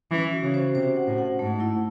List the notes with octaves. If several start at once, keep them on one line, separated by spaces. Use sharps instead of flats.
E3 C#4
F#4
C#3
C5
C3 C5
F#5
A2
F#5
G#2 A3
E4